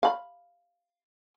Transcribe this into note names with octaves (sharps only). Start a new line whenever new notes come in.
F5 B5